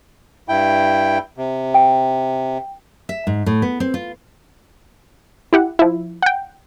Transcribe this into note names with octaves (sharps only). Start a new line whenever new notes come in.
G2 E4 G5
C3
G5
E5
G#2
A2
B3
C4
F4
E4 G4 F#5
F3 E4
F#5 G5